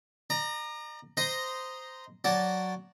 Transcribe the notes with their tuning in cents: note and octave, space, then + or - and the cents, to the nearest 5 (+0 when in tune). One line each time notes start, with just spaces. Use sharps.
D5 +45 A#5 +0
C5 -10 D#5 -5 A#5 +0
F#3 +0 D5 -10 A5 +0